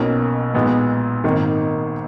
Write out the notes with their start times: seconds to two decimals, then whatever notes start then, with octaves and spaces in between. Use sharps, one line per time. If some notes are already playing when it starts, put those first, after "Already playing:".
Already playing: B1 B2 A#3 C#4
0.54 B1 A#2 G#3 B3
1.24 G#1 G#2 D#3 A#3